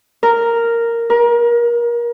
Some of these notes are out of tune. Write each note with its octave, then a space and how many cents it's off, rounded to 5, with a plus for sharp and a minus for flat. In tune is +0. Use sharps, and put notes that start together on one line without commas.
A#4 -5
A#4 +30